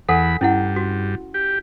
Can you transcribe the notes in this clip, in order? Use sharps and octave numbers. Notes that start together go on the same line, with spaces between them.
E2 A4 F#5 G#5 B5
G2 C#4 E4 F#5
F#4
G4